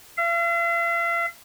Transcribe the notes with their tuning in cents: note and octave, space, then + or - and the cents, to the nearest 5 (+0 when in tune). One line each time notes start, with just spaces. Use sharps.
F5 -45